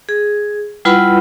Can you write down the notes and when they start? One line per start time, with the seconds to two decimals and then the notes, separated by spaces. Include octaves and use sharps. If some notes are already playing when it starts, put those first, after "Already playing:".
0.09 G#4
0.85 G3 E4 F4 B4 F#5 B5